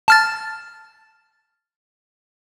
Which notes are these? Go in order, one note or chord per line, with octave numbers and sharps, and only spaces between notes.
A5 F6 A6